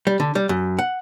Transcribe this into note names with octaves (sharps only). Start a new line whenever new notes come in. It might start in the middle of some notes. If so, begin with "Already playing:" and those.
G3
D3
G3
F#2
F#5